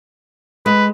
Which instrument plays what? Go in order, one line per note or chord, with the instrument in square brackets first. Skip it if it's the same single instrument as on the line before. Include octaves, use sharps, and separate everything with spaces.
[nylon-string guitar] G#3 [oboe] B4